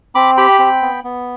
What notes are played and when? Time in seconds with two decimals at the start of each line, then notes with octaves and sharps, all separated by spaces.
0.15 C4 B5 D6
0.38 G4 G5 B5
0.59 C4
0.82 B3
1.04 B3